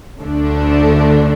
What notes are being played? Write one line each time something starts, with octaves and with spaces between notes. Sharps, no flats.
D2 D3 A3 D4